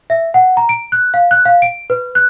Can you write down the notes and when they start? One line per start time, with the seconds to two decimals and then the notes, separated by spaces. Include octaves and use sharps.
0.10 E5
0.34 F#5
0.57 A#5
0.69 D7
0.92 F#6
1.14 F5
1.31 F#6
1.45 F5
1.62 D7
1.90 B4
2.15 F#6